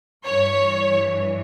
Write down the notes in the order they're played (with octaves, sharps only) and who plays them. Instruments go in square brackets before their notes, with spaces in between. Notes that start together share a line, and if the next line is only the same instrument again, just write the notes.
[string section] G2 E3 C#5